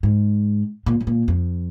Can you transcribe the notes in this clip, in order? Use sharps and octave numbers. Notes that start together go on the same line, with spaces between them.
G#2
A#2
G#2
A#2
F2